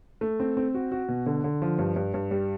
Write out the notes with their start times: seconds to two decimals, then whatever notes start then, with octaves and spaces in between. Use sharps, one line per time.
0.21 A3
0.40 C4
0.57 C4
0.75 F#4
0.92 F#4
1.08 B2
1.26 D3
1.44 D3
1.62 F3
1.79 G2
1.96 G2
2.14 G2
2.31 G3